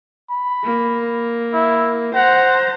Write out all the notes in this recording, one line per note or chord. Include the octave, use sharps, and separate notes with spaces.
B5
A#3
E4
C5 F#5 A#5